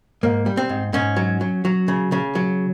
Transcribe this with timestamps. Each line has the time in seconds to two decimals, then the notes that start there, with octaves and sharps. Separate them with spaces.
0.23 G#2 A#3
0.46 G3
0.57 C4
0.69 G#2
0.93 G#2 C#4
1.16 F#3
1.41 F#3
1.65 F#3
1.88 C#3
2.12 C#3
2.35 F#3